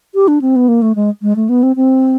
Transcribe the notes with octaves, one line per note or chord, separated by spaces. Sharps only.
G4
D4
C4
B3
A#3
A3
G#3
G#3
A3
B3
C4
C4